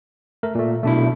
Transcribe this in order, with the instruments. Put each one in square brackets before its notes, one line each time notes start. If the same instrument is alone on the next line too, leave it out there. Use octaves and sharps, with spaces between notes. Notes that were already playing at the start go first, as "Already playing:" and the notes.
[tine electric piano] A3 A#4
A#2 A3
[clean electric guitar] B1 E4 [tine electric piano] A3 D4